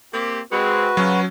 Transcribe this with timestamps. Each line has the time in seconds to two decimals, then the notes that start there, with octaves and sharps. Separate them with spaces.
0.13 A#3 C4 G4
0.52 G#3 C4 F#4 B4
0.97 C#3 F#3 C#4 F4